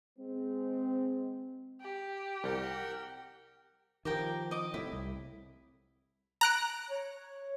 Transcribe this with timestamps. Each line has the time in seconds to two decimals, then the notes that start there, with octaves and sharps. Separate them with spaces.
0.19 G#3 C4
1.81 G4
2.44 C2 A#4 F#5 G5
4.05 D#3 F3 G4 A#4 G5
4.51 D#5 D6
4.74 A2 C3 E4
4.92 C2
6.41 A#5 F#6 D7
6.90 C#5